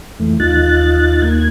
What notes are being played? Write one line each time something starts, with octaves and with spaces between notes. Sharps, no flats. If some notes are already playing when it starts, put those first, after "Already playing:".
F2 E3 A3
D#2 D#4 F4 F#6 A6
D#2 A#3 G#6